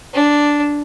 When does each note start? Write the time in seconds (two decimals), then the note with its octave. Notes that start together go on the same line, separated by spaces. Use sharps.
0.14 D4